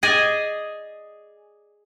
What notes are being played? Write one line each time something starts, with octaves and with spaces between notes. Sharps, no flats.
G#4 D5 D#5 G#5